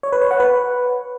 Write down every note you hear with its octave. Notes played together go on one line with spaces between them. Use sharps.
C#5
B4
C#5
F#5
B4